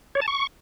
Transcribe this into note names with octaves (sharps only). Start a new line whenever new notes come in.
C#5
A5
C#6